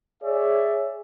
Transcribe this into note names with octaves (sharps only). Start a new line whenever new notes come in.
G#4 C#5 D5 E5